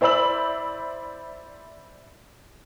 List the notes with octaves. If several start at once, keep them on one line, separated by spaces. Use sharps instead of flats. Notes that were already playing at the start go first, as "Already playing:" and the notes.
E4 C5 D5 B5 E6 F#7